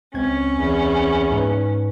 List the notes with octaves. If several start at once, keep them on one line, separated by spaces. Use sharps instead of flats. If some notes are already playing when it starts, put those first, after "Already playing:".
C#2 C4 C#4 G#6
E2
G#2 B4